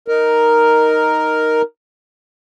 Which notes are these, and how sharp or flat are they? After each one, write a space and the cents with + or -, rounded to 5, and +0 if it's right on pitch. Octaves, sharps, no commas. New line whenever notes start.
D#4 +0 A#4 +0